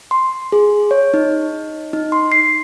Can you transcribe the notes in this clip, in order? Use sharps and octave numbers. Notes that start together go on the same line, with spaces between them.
C6
G#4
C#5
D#4
D#4
C6
C7